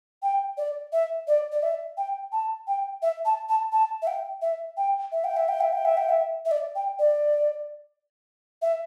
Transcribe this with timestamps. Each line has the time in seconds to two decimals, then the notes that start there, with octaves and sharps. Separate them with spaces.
0.23 G5
0.58 D5
0.93 E5
1.28 D5
1.52 D5
1.63 E5
1.97 G5
2.32 A5
2.68 G5
3.02 E5
3.25 A5
3.49 A5
3.72 A5
4.02 E5
4.07 G5
4.42 E5
4.77 G5
5.12 E5
5.24 G5
5.37 E5
5.49 G5
5.61 E5
5.73 G5
5.85 E5
5.97 G5
6.09 E5
6.46 E5
6.51 D5
6.76 G5
6.99 D5
8.62 E5